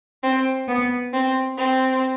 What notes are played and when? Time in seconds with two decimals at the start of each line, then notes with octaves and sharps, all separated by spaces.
0.23 C4
0.67 B3
1.13 C4
1.57 C4